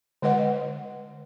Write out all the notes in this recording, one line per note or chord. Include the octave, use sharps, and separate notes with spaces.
D3 G#3 B4 D#5 F#5